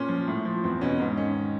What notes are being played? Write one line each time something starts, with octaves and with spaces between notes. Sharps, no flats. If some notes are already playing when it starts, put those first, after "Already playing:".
Already playing: A#2 C#4
F3
A2
F3
E2 C4
B2 C#4
G#2 C#4
D#3 C#4